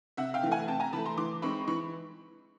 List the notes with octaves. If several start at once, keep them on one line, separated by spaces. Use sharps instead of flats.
C3 E5 F#5
F5 G5
E3 A3
F#5 G#5
C3 G5 A5
G#5 A#5
E3 A3 A5 B5
A#5 C6
E3 C6 D6
G#3 C4 D#4 B5 C#6
E3 B5 C#6